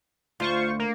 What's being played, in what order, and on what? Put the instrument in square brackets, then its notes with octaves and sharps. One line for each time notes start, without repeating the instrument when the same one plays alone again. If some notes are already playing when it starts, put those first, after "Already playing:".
[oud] D2 [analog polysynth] F4 C5 C#6
[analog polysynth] A#3